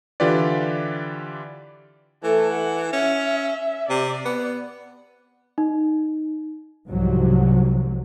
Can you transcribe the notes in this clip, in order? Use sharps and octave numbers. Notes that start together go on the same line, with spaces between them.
D3 E3 F4 G4 B4 D5
E3 A3 A4
F#5
C#4 E5
C3 D5
B3
D#4
C2 G#2 C3 F3 F#3